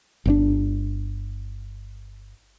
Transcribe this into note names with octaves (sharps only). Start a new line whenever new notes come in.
G1 A#2 D4